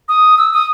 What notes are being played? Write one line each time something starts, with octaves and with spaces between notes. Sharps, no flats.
D#6
E6
D#6